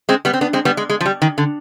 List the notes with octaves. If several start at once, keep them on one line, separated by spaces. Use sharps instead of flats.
G#3 C4
G3 B3
C4
B3 D4
G#3 C4
G3 B3
G#3
G#3
F3
G3
D#3
D3